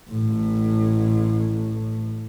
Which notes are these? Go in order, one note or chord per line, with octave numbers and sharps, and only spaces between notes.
A1 A2